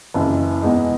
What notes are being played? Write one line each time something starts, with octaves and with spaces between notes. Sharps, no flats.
F#1 F#2 E3
E2 B2 G#3 D#4